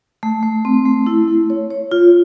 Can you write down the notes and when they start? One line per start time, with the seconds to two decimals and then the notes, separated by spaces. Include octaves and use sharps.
0.23 A3
0.43 A3
0.65 C4
0.85 A3
1.06 E4
1.28 A3
1.50 C#5
1.71 C#5
1.91 F4